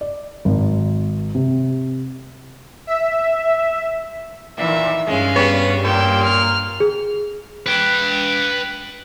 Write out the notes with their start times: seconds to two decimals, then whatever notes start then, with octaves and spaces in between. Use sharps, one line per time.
0.01 D5
0.45 G#1
1.35 C3
2.87 E5
4.58 A#2 D#3 E3 E5
5.07 G2 G#3 C#4 F5
5.36 G3 B3 C#5
5.84 A#2 G5 E6
6.22 F6
6.80 G#4
7.66 B4 G5